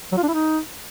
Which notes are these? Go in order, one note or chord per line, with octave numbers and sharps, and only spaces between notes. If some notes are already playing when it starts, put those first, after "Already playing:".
F#3
F4
D4
E4
D#4